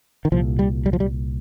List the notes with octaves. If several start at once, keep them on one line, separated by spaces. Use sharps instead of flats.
D#3
C2 A#2 F3
G3
G3
F3
G3